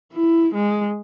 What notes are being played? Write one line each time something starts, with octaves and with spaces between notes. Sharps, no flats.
E4
G#3